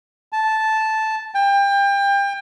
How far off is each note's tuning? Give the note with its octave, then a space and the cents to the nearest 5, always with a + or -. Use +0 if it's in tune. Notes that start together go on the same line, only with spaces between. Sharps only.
A5 -10
G5 +30